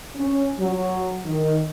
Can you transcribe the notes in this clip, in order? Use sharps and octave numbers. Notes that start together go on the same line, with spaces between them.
C#4
F#3
D#3